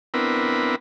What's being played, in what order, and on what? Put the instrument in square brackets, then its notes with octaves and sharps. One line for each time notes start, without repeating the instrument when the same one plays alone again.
[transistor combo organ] B3 C4 D4 E4 A#4 B4